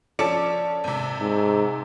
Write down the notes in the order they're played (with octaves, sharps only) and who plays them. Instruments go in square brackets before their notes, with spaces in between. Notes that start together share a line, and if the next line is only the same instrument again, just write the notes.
[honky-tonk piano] F3 C#4 C#7 [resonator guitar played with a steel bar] A4 D5
[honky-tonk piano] G#1 C3
[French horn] G#2